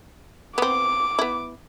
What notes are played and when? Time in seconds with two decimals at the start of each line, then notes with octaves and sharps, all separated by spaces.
0.58 B3 C4 D6
1.19 B3 E4